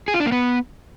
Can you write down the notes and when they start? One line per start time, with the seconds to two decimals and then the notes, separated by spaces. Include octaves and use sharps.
0.08 G#4
0.14 F4
0.20 D4
0.26 A#3
0.32 B3